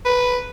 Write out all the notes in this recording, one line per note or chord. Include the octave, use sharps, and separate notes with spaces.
B4